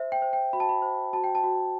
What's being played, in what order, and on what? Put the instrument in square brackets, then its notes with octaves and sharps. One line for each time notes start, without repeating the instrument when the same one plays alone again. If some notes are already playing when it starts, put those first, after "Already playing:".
Already playing: [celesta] C5 E5
G5
C5
G5
F#4 B5
A5
B5
C5
F#4 A5
G5
A5
F#4